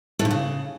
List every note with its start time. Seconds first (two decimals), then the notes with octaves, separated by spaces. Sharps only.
0.19 A2
0.25 G2
0.31 C#3